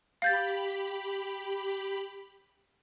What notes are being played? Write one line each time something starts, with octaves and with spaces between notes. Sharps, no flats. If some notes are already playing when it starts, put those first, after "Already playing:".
G4 F5 B5 G6 A6